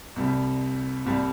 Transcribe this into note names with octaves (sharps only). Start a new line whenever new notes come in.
C2 C3 G3
C2 C3 G3